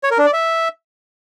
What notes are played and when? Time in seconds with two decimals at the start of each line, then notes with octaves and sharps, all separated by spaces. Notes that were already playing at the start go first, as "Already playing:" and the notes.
0.04 C#5
0.11 A#4
0.18 D4
0.26 D5
0.33 E5